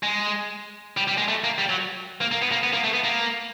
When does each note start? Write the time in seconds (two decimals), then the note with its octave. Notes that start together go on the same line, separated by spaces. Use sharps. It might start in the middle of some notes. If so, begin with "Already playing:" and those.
0.03 G#3
0.97 G3
1.08 G3
1.18 G#3
1.28 A3
1.44 A#3
1.58 G3
1.70 F#3
2.21 A#3
2.32 A#3
2.42 B3
2.52 A#3
2.63 B3
2.73 A#3
2.84 A3
2.94 B3
3.04 A#3